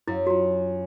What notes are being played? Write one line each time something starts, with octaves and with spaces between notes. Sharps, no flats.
F#2 E4
F#4
F4